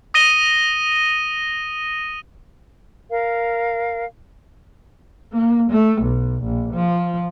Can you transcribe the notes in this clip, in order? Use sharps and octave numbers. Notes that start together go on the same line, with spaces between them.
D#6 A#6 D#7 G7
A#4 F5
A#3
A3
B1
A#1
F3